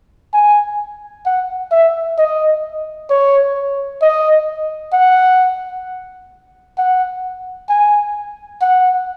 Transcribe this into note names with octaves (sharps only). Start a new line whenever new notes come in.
G#5
F#5
E5
D#5
C#5
D#5
F#5
F#5
G#5
F#5